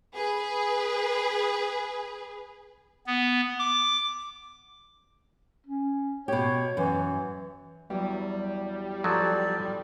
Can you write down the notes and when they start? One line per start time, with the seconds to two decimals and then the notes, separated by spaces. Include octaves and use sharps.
0.16 G#4 B4
3.07 B3
3.59 D6
5.66 C#4
6.28 B2 G4 C#5
6.77 F#2 E3
7.90 E2 F#3 G3
9.04 F3 F#3 A4 D5